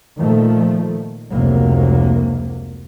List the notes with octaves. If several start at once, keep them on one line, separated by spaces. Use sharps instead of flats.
A#2 D#3 F3 A3
F1 C#2 C3 F#3 A#3